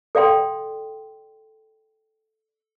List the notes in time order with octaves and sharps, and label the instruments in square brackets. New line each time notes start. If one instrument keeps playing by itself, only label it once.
[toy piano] A4 D5 F5 G5 C6